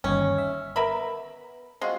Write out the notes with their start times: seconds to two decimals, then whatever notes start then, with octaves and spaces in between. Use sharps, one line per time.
0.04 G1 D#2 C#4 D#5
0.38 E5
0.76 B3 A#4 E5 B5
1.81 G#3 C4 F4 F#4